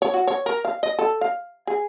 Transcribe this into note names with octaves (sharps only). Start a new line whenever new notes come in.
C#5
F#4
C#5
A#4
F5
D#5
A4
F5
G#4